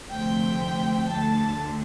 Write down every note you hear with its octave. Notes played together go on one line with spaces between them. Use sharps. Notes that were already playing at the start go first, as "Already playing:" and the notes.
D2 C3 F3 A3 C4 G5
D2 D3 A3 A5